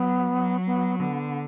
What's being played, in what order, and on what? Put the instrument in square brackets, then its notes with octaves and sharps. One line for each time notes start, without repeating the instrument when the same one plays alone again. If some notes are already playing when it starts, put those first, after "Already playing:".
Already playing: [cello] F#3 [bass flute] B3
[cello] F#3
[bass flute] B3
[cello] D3 [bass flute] B3